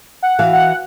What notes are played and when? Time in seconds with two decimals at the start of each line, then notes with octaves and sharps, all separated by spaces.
0.23 F#5
0.39 E3 F#4 F5
0.53 F#5